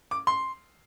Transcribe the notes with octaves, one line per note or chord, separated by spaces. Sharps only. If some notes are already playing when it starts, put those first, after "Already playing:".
D6
C6